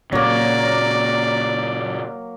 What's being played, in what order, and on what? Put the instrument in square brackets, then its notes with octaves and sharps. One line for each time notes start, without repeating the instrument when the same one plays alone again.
[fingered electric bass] A#2 C#3 [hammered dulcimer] F#3 A#3 [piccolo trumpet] D5